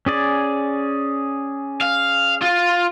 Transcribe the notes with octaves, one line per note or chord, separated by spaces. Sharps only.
C#4 G#4 D5
F5
F4